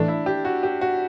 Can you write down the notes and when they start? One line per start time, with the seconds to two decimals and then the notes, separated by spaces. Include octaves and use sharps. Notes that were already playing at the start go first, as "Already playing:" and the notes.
Already playing: A2 E3 A3 D4
0.08 E4
0.26 G4
0.45 F#4
0.63 G4
0.81 F#4